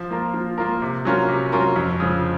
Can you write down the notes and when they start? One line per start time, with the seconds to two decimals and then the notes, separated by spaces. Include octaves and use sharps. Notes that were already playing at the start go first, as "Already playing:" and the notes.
Already playing: F3
0.10 A#3 F4 A#4
0.34 F3
0.58 A#3 F4 A#4
0.82 C3
1.05 F#3 C#4 F4 A#4
1.28 C3
1.52 F#3 C#4 F4 A#4
1.76 F2
2.00 C#3 F3